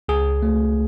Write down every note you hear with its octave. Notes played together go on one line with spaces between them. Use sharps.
C#2 G#4
A3